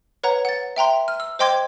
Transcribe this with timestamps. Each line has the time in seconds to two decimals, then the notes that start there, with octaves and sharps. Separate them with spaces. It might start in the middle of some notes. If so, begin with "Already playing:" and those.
0.24 B4 C#5 F#5 A#5
0.45 F#5 A6
0.76 E5 G5 A#5 C6
1.08 F6
1.20 E6
1.39 C5 D#5 G5 C6 D6 G#6